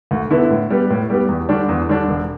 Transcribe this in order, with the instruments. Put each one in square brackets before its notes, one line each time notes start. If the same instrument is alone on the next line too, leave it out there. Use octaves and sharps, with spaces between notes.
[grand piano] D2
D3 B3 E4
A2
G3 B3 G4
A2
G3 B3 G4
E2
D3 G3 D4
E2
D3 G3 D4
E1